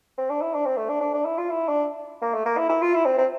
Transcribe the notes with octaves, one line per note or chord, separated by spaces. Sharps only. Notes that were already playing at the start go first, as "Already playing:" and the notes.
C4
D4
E4
D4
C4
A3
D4
D4
D4
E4
F4
E4
D4
A#3
A3
A#3
E4
E4
F4
E4
C4
C4